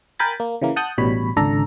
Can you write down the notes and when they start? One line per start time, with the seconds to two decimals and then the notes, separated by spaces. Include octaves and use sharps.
0.19 A#4 G5 G#5 B5 A6
0.40 A#3
0.62 C#3 E3 A#3
0.76 F#5 A5 D#6 F#6 G6
0.98 A1 B2 G3 C#5 B5
1.36 G#1 C#2 D3 D4 A4 A#5